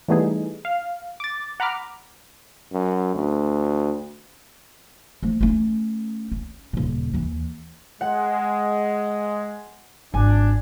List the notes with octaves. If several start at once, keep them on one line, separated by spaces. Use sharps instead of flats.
E3 G3 A3 B3 D#4 G#4
F5
D6 A6
F#5 A#5 B5 D6 F6
F#2
D2
F3 A3
A3 C#4
C#4
D#1 C#3
D#2 E3
G#3 F#5
G#1 D4 G#5